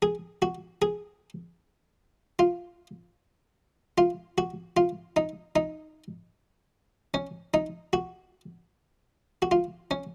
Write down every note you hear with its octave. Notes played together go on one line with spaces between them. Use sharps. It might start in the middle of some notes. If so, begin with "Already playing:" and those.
G#4
F#4
G#4
F4
F4
F#4
F4
D#4
D#4
C#4
D#4
F#4
F#4
F4
C#4